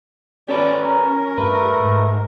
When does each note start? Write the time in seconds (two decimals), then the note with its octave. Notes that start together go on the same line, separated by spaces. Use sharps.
0.48 C#4 G4 A4 B4 D5
0.84 A#4 A#5
1.38 G2 A3 B4
1.80 G#2